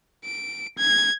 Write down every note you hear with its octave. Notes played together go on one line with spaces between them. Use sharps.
D7
G#6